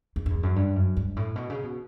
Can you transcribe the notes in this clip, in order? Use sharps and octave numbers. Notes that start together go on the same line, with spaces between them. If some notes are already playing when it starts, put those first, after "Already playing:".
E2
F#2
E2
F#2
G2
F#2
G2
A2
B2
C#3
B2